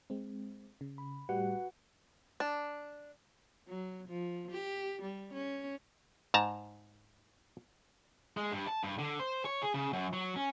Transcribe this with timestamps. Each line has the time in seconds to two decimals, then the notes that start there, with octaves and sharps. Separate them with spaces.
0.10 G#3 C4
0.81 C#3
0.98 B5
1.29 A2 G3 F#4 G4 B4 F#5
2.40 D4
3.68 F#3
4.08 F3
4.51 G4
5.02 G3
5.33 C#4
6.34 G#2 A5 A#5
8.37 G#3
8.52 G2
8.67 A5
8.84 G2
8.99 D3
9.20 C5
9.45 C#5
9.62 G#4
9.74 C#3
9.93 F#2
10.13 F#3
10.36 C#4